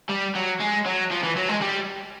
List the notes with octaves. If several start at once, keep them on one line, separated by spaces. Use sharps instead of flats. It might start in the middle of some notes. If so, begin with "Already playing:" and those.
G3
F#3
G#3
F#3
F3
E3
F#3
G#3
G3